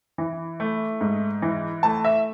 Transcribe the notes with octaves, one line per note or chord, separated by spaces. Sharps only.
E3
A3
G#2
E3
A3 A5
E5